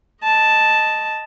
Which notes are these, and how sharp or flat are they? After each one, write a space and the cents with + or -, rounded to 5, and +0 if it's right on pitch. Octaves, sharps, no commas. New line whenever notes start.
D#5 +0 A5 +0